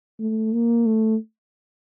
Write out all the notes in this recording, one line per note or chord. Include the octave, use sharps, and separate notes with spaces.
A3
A#3
A3